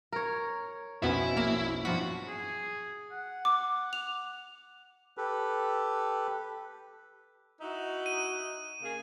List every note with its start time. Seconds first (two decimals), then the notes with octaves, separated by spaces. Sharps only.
0.12 A#4 C#5
1.02 B1 F2 B2 B3 C#4 E4
1.36 A#1 A#3 E7
1.85 G2 F3 F#4 B6
2.28 G#4
3.12 F#5
3.45 D6
3.93 F7
5.17 G4 A4 B4
7.60 D#4 E4 F#4
8.06 D#7
8.83 C#3 A#3 G#4